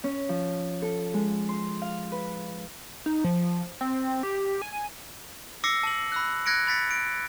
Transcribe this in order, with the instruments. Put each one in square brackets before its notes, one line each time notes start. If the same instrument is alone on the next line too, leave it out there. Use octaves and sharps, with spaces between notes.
[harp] C#4
F3
A4
G#3
C6
F5
B4
[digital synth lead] D#4
F3
C4
G4
G#5
[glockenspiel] D6 E6 A#6 C7 C#7
A5 F#7
B5 E6 F#6
F#6 G#6 A#6 C#7 D7
B5 A6 B6 C#7
D7